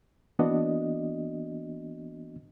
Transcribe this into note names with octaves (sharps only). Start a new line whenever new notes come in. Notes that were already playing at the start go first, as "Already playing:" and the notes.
E3 A#3 B3 D4 F#4 D#5